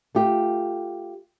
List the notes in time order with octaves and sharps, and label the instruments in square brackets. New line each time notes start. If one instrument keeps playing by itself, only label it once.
[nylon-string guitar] A3 F4 G4